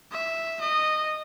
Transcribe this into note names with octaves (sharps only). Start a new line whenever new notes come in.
E5
D#5